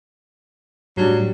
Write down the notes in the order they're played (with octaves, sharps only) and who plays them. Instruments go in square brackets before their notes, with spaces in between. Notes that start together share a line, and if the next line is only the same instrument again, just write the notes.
[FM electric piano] A2 [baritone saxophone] F#3 [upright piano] G3 D4